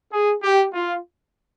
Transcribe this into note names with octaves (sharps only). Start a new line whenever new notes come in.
G#4
G4
F4